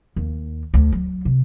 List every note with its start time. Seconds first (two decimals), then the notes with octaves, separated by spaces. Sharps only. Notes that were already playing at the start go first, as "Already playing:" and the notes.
0.16 D#2
0.74 D2
0.92 F#3
1.25 C3